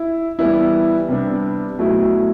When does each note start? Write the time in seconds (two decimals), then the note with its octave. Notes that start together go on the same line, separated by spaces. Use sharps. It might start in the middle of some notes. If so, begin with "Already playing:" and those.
Already playing: E4
0.39 E3 G3 B3 E4
1.09 C3 G3 B3 D4
1.79 B2 F#3 A3 E4